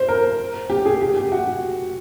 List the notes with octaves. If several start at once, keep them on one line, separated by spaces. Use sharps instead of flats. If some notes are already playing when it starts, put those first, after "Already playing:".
Already playing: C5
A#4
G4
G#4
G4
G4
F#4